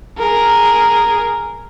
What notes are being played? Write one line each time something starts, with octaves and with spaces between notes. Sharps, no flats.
G#4 A#4